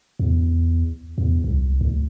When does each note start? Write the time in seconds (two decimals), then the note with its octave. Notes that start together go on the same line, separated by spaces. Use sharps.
0.19 E2
1.18 E2
1.44 C2
1.81 D2